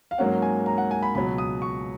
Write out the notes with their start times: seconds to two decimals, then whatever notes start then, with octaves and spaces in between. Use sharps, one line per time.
0.11 F5
0.18 G#2 F#3 A#3 C#4 F#5
0.42 G#5
0.66 A#5
0.78 F#5
0.91 G#5
1.03 B5
1.15 C#2 B2 F#3 B5
1.38 D#6
1.62 C#6